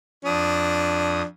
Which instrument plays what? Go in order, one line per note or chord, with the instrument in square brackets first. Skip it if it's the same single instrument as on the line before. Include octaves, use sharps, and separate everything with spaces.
[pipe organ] F2 D#6 [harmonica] D4